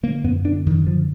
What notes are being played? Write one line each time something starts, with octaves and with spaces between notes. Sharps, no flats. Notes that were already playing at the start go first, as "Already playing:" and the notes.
D3 A#3
F#2 B3
D3 D4
F#2 D#3
D3 F3